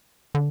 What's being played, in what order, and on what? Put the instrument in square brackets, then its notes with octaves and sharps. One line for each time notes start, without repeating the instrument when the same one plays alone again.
[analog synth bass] D3